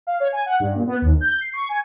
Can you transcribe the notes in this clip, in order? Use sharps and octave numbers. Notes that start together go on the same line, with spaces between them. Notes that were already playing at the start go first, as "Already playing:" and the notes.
F5
C#5
G#5
F#5
G2
A#2
B3
D#2
G6
C7
C#6
G#5